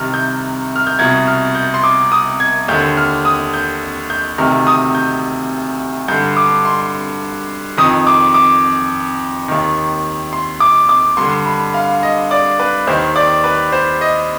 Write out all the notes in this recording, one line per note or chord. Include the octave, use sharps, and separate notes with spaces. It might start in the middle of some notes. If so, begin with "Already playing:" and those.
Already playing: C2 C3 D#3 F6
G6
F6
G6
C2 B2 G#6
F6
G6
C6
D6
D#6
G#6
D#2 D3 G6
F6
D#6
G6
G6
D2 C3 D#3 F6
D#6
G6
G2 D3 G6
D6
C6
F2 D#3 D#6
D6
D6
D#2 D#3
C6
D6
D6
G2 D3 C6
B5
F5
D#5
D5
B4
D#2 D#3 C5
D5
B4
C5
D#5